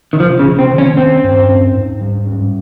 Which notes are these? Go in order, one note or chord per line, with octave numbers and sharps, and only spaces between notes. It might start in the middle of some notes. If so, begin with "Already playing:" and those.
D#3
C3 F3
C#3
C3
C4
D#3
C#4
C4 C#4
G2
C#4
G#2
G3
C#4